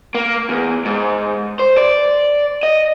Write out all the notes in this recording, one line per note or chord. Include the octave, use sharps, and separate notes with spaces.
A#3
E2
G#2
C5
D5
D#5